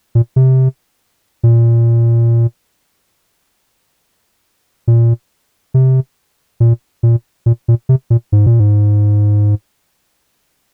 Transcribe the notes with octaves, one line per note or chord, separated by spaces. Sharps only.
A#2
C3
A#2
A#2
C3
A#2
A#2
A#2
A#2
C3
A#2
G#2
A#2
G#2